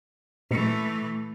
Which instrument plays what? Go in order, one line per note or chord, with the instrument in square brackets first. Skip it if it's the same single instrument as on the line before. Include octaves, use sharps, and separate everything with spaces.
[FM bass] A#2 [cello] E3 A3